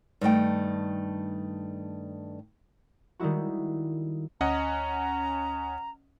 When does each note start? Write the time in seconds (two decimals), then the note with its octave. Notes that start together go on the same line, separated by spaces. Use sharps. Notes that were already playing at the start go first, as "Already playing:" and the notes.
0.21 G2 D#3 A3 G5
3.20 D#3 G3 G#3 E4 F#4
4.41 D2 C#4 D#5 F#5 A#5